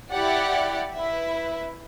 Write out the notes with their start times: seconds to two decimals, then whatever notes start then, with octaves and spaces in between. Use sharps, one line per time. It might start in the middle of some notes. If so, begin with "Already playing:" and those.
0.10 E4 G4 D5 F#5
0.93 E4 B4 E5